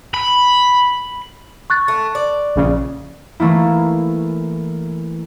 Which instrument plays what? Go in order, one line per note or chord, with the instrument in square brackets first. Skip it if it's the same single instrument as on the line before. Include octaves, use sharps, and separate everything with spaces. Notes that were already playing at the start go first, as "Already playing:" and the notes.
[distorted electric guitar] B5
[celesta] C#6 F#6 A6
[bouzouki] A3
D5
[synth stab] A#1 C#3
[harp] E3 A3 A#3 E4